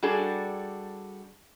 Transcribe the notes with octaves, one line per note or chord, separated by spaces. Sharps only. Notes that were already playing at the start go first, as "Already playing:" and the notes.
G3 D4 F#4 G#4 A4